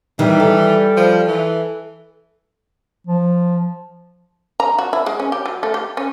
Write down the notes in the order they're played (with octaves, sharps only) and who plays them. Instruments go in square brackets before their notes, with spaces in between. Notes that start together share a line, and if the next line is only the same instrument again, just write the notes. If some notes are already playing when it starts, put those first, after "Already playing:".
[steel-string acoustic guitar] D#3 [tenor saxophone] E3 [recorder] G3
[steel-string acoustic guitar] A4
[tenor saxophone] F3
E3
[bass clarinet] F3
[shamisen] A#5
F#4
E4
G#3
C#4
G4
F#3
A3
G4
C#4